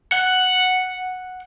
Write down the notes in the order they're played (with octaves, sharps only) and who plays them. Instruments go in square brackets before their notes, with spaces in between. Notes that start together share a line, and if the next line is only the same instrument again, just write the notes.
[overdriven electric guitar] F#5